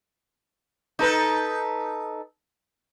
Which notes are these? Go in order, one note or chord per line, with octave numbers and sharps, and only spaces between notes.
D#4 A4 B4